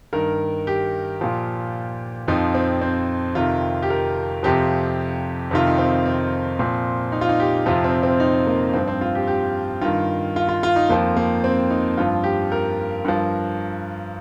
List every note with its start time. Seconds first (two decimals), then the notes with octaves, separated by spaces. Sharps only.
0.13 G2 D#3 A#4
0.67 G4
1.21 A#2 F3
2.28 F2 F3 D#4
2.55 C4
2.82 C4
3.35 F2 C3 D#3 F4
3.82 G4
3.90 A#4
4.43 F2 C3 F3 G4
5.51 F2 C3 D#3 F4
5.67 D#4
5.78 C4
6.06 C4
6.59 A#2 F3 C4
7.12 D#4
7.21 F4
7.29 D#4
7.40 G4
7.66 F2 C3 F3 F4
7.84 C4
8.03 C4
8.20 D#4
8.47 A#3
8.74 G2 F3 C4
8.88 C4
9.01 F4
9.15 G4
9.27 G4
9.81 G2 D#3 F4
10.36 F4
10.49 F4
10.63 F4
10.76 D#4
10.89 F2 F3 A#3
11.16 A#3
11.44 C4
11.70 D#4
11.98 G2 F3 F4
12.24 G4
12.52 A#4
13.05 G2 F3